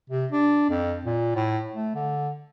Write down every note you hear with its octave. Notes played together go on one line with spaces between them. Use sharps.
C3
D4
F2
A#2
A2
A3
D3